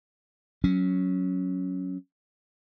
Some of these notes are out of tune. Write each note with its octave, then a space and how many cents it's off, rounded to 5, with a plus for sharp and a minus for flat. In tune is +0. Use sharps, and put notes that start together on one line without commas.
F#3 +0 C#4 +0